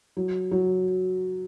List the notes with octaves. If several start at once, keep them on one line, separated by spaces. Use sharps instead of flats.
F#3
F#3